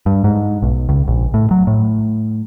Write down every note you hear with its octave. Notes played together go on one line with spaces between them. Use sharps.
G2
G#2
B1
C#2
A#1
A2
F#3
A2